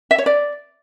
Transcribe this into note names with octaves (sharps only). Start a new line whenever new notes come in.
E5
C#5
D5